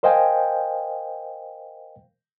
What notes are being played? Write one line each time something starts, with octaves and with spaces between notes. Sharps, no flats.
A#4 C5 D#5 F5 G5 G#5